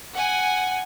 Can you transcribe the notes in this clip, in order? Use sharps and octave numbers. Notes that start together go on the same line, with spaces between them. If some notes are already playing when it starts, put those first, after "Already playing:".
F#5 G#5